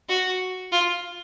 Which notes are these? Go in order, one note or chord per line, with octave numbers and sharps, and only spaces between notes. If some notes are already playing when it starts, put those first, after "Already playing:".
F#4
F4